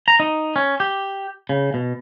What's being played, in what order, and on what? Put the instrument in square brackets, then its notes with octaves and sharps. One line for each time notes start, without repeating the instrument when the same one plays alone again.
[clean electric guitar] A#5
D#4
C#4
G4
C#3
B2